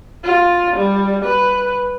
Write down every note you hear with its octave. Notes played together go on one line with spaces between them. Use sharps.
F4
G3
B4